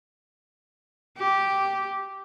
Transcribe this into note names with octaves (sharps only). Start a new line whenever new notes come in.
G4